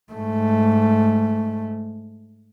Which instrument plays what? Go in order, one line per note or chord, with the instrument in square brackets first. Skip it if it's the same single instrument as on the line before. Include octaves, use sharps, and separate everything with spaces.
[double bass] G#2 A3